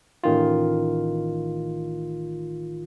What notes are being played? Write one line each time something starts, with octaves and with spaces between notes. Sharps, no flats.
A1 D#3 F4